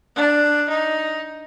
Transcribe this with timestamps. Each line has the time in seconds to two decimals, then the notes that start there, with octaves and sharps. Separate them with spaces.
0.16 D4
0.69 D#4